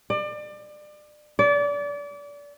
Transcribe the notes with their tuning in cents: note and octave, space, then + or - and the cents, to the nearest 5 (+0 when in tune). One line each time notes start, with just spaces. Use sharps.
D5 +30
D5 -30